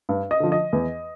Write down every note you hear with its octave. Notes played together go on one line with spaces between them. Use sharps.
G2
D#5
D3 F3
D#5
E2